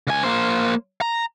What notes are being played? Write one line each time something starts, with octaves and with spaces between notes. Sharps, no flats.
C#2 G#5
A#3 C5
A#5